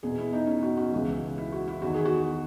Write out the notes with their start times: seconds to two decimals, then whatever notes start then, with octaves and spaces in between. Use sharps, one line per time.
0.03 E2 B2 G#4
0.18 E4
0.33 D#4
0.47 C#4
0.62 F#4
0.77 F#4
0.92 C#2 C#3 E3
1.38 E4
1.52 F#4
1.68 E4
1.82 E2 D#3 F#4
1.94 G#4
2.05 F#4